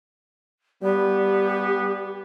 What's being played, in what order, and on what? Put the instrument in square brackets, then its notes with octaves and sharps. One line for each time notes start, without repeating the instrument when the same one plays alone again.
[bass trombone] G3 [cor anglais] B3 [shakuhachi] G4